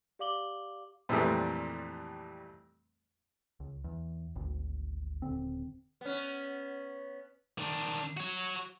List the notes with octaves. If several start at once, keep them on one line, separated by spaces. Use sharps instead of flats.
G4 D5 F5 D6 F#7 G7
F2 A#2 E3 G3 A3 C4
C#2
E2
G#1 D2
D#1 D3 C4
B3 C#4
D#3 D4
F#4 C#5